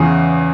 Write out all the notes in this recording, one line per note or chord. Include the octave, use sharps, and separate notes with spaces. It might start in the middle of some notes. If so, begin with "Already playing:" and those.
Already playing: E2 C#3 E3 G#4